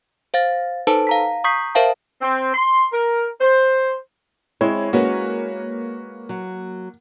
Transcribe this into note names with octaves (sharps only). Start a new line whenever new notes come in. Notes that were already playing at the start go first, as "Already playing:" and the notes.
C5 F5 A6
D#4 A4 B4 C5 A5
F5 A#5 B6
A#5 C#6 D#6 G6 B6 C7
A#4 C5 E5 F5 A5
C4
C6
A#4
C5
G#3 C4 E4 C#5
G#3 A#3 C#4 F#4 B4 C#5
F#3